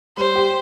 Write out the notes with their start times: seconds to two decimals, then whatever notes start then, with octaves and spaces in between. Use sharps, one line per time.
0.17 G3 C5
0.35 G4